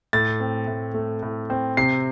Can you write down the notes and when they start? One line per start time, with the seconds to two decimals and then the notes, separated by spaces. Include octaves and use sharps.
0.13 A2 A6
0.40 C4
0.67 A2
0.94 A3
1.23 A2
1.50 C4
1.77 C3 C7